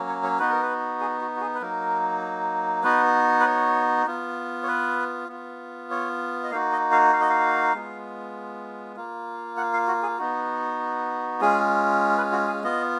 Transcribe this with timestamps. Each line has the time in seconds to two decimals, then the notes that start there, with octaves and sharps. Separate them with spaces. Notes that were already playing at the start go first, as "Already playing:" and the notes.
Already playing: F#3 A#3 C#4
0.09 C#5
0.23 C#5
0.39 B3 D#4 F#4 B4
0.51 A#4
0.62 B4
1.00 G#4
1.21 F#4
1.36 F#4
1.41 G#4
1.54 B4
1.61 F#3 A#3 D#4 A#4
2.83 B3 D#4 F#4 B4
3.40 B4
3.45 C#5
4.06 B3 F4
4.63 C#5
4.68 B4
5.29 B3 F4
5.91 C#5
6.44 D#5
6.51 A#3 D#4 F#4 F5
6.72 D#5
6.92 F5
7.13 F5
7.21 D#5
7.29 F5
7.74 G#3 B3 F4
8.96 A#3 F4
9.57 F#5
9.73 F5
9.88 F#4
10.03 G#4
10.18 B3 D#4 F#4
11.41 G#3 C#4 F4 G#4
12.18 B4
12.32 F#4
12.47 G#4
12.63 B3 F4 D#5